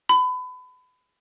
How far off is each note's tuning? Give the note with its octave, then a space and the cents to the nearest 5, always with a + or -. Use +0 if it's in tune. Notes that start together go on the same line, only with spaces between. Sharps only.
B5 +30